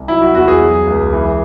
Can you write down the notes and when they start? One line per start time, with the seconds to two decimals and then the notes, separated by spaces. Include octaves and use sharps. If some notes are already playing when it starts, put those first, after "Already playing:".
Already playing: C2
0.08 F#3 E4
0.22 F#4
0.35 E2 F#4
0.48 G#4
0.60 F#3
0.87 C#2
1.13 E3